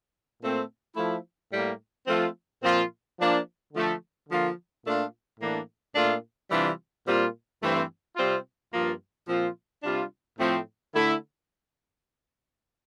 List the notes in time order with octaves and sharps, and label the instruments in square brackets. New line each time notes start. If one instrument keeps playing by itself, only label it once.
[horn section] A#2 A3 C4
F3 A3 E4
A2 G3 A#3
F3 A3 C4 F4
A#2 F3 C4 F4
F3 A#3 D4 F4
D3 F3 A3
D3 F3 A#3 F4
A#2 A3 D4 F4
A2 E3 A#3 D4
A#2 A3 D4 F4
C3 E3 G3 D4 F4
A#2 G3 C4 F4
G2 E3 A3 C4
C3 G3 C4 F4
G2 F3 A#3 F4
A#2 F3 C4 F4
C3 G3 D4 F4
A2 F3 A3 C4
D3 A3 E4